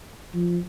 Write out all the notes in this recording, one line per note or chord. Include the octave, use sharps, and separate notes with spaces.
F3